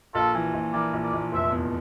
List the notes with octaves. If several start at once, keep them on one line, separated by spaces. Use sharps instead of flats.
A#1 F4 A4
E3
A#1
E3 A#4 D5
A#1
A#4 D5
A#1
F1 C5 E5
E2